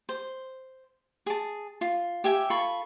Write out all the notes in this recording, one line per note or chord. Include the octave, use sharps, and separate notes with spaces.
C5
G#4 A5
F4
G4 E5 G#5
F4 A4 B5 C#6